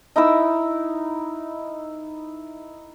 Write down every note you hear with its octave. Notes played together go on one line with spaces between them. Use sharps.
D#4 E4 A#4 E6